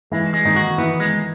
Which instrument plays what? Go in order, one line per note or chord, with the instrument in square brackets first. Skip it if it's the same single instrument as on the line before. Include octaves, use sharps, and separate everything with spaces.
[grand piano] E3 E4 [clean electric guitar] G#3
[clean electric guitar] G#3
[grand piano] D#3 D#4
[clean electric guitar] F#4
[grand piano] E3 E4 [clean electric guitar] B3
[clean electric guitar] G#3